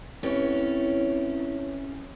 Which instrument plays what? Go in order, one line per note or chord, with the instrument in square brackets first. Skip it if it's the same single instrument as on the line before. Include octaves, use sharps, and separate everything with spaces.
[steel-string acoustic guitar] A3 C#4 G4 [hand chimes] C4 B4 C#5 [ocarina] E4